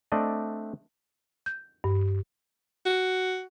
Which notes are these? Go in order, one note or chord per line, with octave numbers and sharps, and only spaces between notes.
A3 C4 D4 D5 D#5
G6
G2
F#4